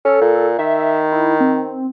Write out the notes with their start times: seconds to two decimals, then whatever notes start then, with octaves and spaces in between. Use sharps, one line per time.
0.05 C#4 A4
0.21 A#2
0.59 D#3 E5
1.12 E4
1.40 C4